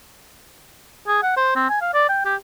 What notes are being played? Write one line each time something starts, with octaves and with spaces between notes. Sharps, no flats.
G#4
F#5
C5
C4
G#5
F5
D5
G5
G4